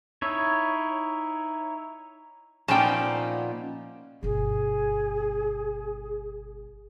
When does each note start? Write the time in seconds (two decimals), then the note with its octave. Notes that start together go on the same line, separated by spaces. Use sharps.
0.22 D#4 E4 C#5
2.68 A#2 F3 B3 C#4 D#4 D5 G5 A5
4.23 G1 B2 G#4